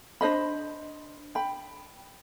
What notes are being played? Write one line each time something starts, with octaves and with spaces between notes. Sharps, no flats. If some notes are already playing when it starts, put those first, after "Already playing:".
D4 C5 D#5 B5
G5 B5